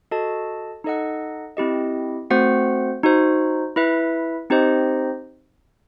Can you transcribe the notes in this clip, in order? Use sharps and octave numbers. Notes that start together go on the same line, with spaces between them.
F#4 A4 D#5 A5
D#4 A4 D#5 F#5
C4 E4 G4 D#5
A3 C4 F#4 C5 F#5
D#4 F#4 C5
E4 B4 E5
C4 D#4 G4 C5 D#5